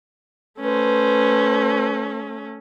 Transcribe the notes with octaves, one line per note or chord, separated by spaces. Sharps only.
A3 C#4 B4 C5